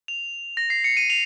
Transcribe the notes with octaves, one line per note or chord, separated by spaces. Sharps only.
F7
A#6
C7
C#7
D#7
F7